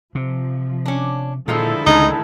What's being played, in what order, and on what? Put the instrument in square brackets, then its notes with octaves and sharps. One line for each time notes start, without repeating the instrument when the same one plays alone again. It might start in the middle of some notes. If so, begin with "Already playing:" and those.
[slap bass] C3 [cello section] F3
[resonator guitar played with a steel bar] C#4 D4
[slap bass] A#2 [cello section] D3 E4 A4 [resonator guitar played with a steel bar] D#3 F3 G#3
[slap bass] C#2 [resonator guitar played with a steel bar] A2 D#3 G#3 [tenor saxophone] D#4